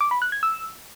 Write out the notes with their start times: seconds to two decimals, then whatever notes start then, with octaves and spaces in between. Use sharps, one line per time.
0.01 D6
0.11 B5
0.22 F#6
0.32 G#6
0.43 E6